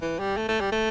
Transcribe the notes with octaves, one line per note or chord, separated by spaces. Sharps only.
E3
G3
A3
A3
G3
A3